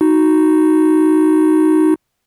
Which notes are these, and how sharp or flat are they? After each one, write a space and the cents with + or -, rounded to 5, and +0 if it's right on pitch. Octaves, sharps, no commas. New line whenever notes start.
D#4 +0 F#4 +0